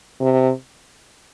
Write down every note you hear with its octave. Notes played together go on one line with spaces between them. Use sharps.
C3